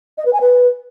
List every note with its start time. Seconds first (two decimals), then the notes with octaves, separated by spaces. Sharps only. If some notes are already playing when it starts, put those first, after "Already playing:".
0.18 D#5
0.25 B4
0.33 G#5
0.41 B4